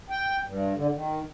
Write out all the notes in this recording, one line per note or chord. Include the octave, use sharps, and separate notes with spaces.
G5
G2
D3
D#3